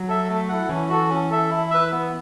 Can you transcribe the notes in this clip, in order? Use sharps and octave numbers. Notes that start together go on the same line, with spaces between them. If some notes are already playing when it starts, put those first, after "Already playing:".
Already playing: F#3
A4 E5
A3
E4 A4 F#5
E3 C#4
F#4 A4
C#4
A4 E5
E4
B4 E5
B3